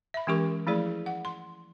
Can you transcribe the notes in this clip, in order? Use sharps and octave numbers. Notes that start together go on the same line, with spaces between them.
E5 B5
E3 G#3 C#4 G4 A#4 C#6
F3 A3 E4 G#4 D5
F#5
C6